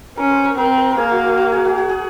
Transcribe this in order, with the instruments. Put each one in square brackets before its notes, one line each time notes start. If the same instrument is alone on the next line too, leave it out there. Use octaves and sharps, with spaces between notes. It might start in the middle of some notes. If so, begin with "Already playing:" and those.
[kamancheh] C#4 [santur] A#4
[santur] C5
A#4
[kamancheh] C4 [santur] A#4
[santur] A#4
A#4
[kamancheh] A#3 [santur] G#4
[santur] F#4
F#4
F#4
G#4
F#4
G#4
G#4